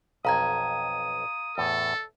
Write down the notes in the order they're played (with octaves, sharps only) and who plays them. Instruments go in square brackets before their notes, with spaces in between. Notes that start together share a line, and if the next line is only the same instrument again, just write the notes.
[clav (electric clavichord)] B1 F2 [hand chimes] F5 A#5 G#6 [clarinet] D#6
[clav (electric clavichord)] E2 A2 [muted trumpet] A4